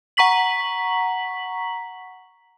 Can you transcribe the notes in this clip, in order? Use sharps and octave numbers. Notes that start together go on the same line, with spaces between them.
F#5 A#5 C#6 B6 F#7